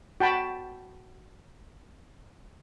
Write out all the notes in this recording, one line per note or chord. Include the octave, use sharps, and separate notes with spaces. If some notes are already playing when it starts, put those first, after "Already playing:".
F#4 G5 A5 B5